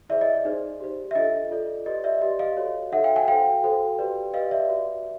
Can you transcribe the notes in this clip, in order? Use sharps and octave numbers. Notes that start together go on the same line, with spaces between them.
E4 G#4 C5 D5 E5
D#5
D5
D#4 G#4 C5
G4 C5
E5
D4 F4 A4 D#5
F4 A4 D5
G4 B4 D5 D#5
D5 E5
G4 B4 D5 D#5
D#5 F5
F#4 A4 C#5
D#4 F#4 A4 C#5 E5 F#5
F5 G5
F#5 G#5
F#4 A4 C5 F5 G5
F#4 A4 C5
G4 B4 D5
G4 B4 D5 D#5 F5
D5 E5
F#4 B4 D5